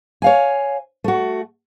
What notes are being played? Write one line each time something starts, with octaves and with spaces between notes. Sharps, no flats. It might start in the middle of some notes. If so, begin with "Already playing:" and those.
C#5 F5 G#5
A3 F#4